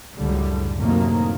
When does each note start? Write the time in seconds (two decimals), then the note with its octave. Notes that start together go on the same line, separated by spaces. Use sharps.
0.15 C#2 F#2 A2 D3 G3
0.77 F#2 A2 C3 D#3 F#3 A#3